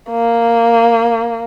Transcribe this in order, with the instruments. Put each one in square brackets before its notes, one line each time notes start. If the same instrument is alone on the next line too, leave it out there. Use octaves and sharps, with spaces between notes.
[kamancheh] A#3